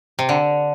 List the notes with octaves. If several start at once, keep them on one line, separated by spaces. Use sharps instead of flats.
C3
D3